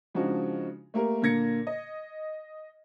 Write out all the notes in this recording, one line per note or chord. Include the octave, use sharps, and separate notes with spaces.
C#3 F3 G#3 D4 D#4 F#4
A3 A#3 G4 A#4
A#2 D3 A#3 G#6 A#6 C#7
D#5